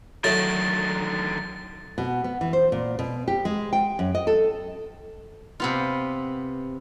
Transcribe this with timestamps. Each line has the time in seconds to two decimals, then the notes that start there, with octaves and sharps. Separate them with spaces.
0.24 A2 D3 D#3 F#3 A3 A6
1.98 B2
2.24 B3
2.41 E3
2.53 C5
2.72 A#2
2.99 B2
3.28 G4
3.45 G#3
3.73 G5
3.99 F#2
4.15 D#5
4.27 A4
5.60 C3 B3 F4